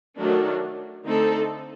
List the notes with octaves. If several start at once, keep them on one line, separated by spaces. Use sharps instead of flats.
D#3 F#3 A3 D4 F#4
D3 A3 C4 D#4 A4